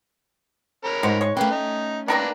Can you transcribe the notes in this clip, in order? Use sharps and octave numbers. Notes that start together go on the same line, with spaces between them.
C#4 A#4 B5
G#2 G#3 F#4 C5
G#3 C#5
A3 A#3 C#4 B4 G5
D#4
D#3 A#3 D4 A#4 B4 A#5